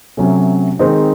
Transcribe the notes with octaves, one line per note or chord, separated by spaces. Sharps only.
C3 F#3 A3 C#4
D#3 G#3 C4 D#4